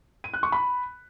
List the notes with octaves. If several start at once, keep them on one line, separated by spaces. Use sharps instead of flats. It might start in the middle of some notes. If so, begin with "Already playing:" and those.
D#7
F#6
C#6
B5